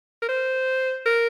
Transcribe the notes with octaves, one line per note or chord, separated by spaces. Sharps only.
A#4
C5
A#4